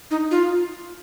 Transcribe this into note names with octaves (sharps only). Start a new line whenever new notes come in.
D#4
F4